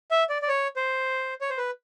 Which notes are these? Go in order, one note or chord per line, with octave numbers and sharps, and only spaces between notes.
E5
D5
D5
C#5
C5
C#5
C5
B4